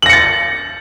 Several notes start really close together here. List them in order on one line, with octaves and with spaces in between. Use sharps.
F#7 A#6 C#7 A6